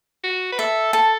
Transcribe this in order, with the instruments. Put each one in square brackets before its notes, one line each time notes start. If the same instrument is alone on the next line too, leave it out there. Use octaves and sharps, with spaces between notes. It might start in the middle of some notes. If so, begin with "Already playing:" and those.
[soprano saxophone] F#4
B4
[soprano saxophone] A4 [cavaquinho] E5
[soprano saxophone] A4 [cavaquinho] A5